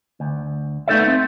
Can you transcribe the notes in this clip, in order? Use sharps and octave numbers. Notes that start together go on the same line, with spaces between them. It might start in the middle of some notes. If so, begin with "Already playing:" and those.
D2
A3 B3 D#4 A4 D5 E5
C4